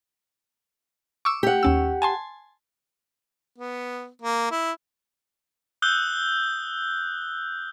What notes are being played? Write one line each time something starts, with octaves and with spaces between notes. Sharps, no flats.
C#6 D6 E6
G4 F#5
D#2 C#4 E6
G#5 A5 C6
B3
A#3
E4
D#6 E6 F#6 G6 G7